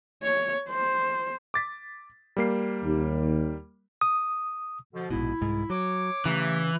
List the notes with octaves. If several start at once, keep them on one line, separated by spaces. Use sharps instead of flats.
C#5
C5
D6 A6 B6
G3 A#3 C7
D#2
D#6
B2 D3 F3
A#1 G#2 B2 E4
C2 G#2
F#3 C#5 D6
C#3 E3 F#3 A3 G4